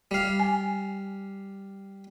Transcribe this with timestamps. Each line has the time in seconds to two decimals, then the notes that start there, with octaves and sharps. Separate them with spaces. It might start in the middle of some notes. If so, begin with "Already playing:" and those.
0.11 G3 F5
0.40 G#5